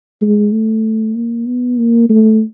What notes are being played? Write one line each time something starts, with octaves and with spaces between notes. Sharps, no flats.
G#3
A3
A#3
B3
A#3
A3